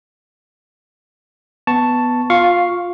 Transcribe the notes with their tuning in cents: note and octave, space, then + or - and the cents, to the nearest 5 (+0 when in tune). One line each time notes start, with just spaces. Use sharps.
B3 +0 A5 +0 C#6 +0
F4 +20 F5 +0 C#6 +0